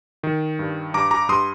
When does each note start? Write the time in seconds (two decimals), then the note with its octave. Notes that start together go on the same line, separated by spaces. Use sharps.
0.23 D#3
0.59 G2
0.94 G2 A#5 D6
1.11 A#5 D6
1.29 G2 C6 D#6